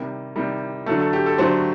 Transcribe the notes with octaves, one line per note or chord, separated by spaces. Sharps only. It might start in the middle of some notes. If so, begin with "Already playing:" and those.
Already playing: C3 D#3 G3
C3 D#3 G3
D3 F#3 A3 A4
A4
G4
A4
D3 F#3 A3 C5